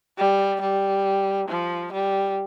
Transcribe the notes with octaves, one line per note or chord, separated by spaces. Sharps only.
G3
G3
F3
G3